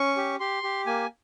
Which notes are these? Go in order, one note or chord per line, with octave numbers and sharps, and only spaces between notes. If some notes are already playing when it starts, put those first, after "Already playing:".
Already playing: C#4 C#6
G4
G4 C6
G4
A#3 G#5